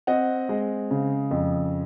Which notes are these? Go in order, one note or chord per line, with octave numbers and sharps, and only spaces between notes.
C4 D#5 F#5
G#3
C#3
F2